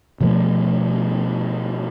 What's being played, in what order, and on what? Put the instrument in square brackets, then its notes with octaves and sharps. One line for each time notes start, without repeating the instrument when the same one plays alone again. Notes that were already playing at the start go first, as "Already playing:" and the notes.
[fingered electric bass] B2 F3 G3 A3